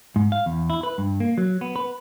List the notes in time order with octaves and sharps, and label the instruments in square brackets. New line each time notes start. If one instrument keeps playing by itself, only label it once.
[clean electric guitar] G#2
F5
E2
E4
B4
G2
A#3
F#3
B3
B4